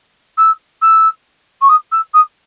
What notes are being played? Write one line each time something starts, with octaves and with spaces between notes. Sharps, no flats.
E6
E6
C#6
D#6
E6
D#6